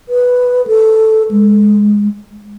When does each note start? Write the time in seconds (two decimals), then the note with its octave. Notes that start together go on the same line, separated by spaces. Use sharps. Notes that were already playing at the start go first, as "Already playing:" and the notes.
0.09 B4
0.67 A4
1.31 G#3